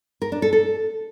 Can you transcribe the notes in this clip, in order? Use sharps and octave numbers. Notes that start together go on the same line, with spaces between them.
A#4
D4
A4
A4